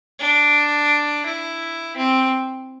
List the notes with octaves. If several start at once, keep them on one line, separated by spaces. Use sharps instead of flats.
D4
E4
C4